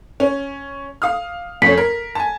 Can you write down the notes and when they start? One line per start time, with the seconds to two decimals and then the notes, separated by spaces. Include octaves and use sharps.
0.20 C#4
1.02 F5 D#6 F6
1.62 F2 A3 C#4 B6
1.78 A#4
2.15 G#5 A5